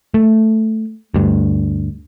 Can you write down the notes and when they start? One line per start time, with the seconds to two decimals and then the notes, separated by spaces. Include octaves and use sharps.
0.14 A3
1.14 D2 G2